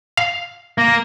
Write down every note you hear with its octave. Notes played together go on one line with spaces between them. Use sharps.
F5
A#3 A#6